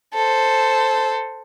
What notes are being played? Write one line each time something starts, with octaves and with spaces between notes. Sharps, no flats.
A4 C5